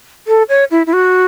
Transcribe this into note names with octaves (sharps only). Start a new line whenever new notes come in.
A4
C#5
E4
E4
F#4